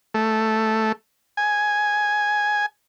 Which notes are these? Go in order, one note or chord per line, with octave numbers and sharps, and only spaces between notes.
A3
G#5